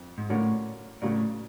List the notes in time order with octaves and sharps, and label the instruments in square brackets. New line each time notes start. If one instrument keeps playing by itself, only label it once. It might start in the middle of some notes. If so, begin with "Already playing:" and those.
Already playing: [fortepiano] F2
[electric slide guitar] G#2
[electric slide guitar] A2 [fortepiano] D3 F#3 A#3 C#4
[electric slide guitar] A2 [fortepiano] C#3 F#3 A#3 D4